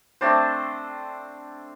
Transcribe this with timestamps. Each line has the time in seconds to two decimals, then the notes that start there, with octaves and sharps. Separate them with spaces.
0.21 A3 C4 D4 C5